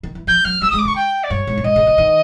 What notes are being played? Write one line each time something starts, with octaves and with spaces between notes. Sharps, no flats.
D#3
E3
F3 G6
F#3 F6
G3 E6
G#3 D#6
D6
D3 C#6
G5
D5
G2 C#5
G#2
G2
G#2 D#5
C#3
D3
D#3